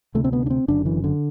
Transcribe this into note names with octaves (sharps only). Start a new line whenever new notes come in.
D2 C3 A3
C4
B3
D4
C4
F#1 F#2 D3 D4
E3
D3